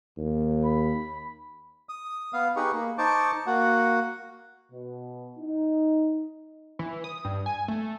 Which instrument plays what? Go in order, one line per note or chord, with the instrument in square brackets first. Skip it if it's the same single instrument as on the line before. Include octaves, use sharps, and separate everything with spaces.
[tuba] D#2
[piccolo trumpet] B5
[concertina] D#6
B3 F5
D#4 G4 G#4 B4 C#6
A#3
D#4 C5 A5 C#6 D6
A#3 F#4 F#5
[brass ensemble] B2
D#4
[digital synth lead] E3
D#6
G2
G#5
A3